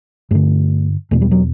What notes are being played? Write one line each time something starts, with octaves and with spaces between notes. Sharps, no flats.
G2 D3 A3
E2 B2 A3
G3
F#3